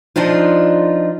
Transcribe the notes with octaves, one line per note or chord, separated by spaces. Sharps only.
F3 D4 D#4 F4